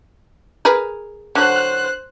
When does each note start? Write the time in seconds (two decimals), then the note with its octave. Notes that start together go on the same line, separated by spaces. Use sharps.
0.65 G#4 A#4 B4
1.35 D3 F#3 C5 F#6